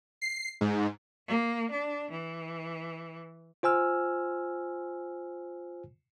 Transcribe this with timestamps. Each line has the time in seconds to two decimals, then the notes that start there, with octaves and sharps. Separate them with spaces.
0.21 C7
0.61 G#2
1.27 A#3
1.71 D4
2.11 E3
3.63 F4 C5 G#5 E6 F6